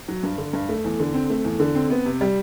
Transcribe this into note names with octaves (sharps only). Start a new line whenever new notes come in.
F#3
G2
D3
G2
A3
E2
D3
C4
A3
E2
D3
C4
B3
C3
G3